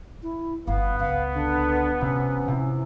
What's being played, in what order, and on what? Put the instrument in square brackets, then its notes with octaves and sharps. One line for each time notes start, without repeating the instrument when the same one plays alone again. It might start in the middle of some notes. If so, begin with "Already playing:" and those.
[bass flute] E4
[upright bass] G1 [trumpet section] B3 [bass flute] F5
[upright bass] C#2 D4 [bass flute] F5
[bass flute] D3
[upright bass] E1 [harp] C3 [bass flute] C#4
[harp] C3 E4